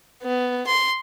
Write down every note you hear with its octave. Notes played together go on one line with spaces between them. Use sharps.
B3
C6